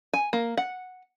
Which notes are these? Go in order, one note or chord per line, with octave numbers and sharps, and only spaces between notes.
G#5
A#3
F#5